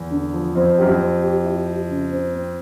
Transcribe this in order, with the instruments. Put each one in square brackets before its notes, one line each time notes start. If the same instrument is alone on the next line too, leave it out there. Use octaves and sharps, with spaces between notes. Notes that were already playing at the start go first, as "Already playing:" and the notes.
Already playing: [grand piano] E2
[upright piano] D3
F3
[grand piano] F2 [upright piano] C4
[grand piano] F#2 [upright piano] G4
[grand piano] F2
[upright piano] C4
G4
E4
G4
C#3
C4
C4